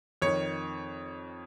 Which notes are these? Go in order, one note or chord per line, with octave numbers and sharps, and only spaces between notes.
F2 D#3 C#5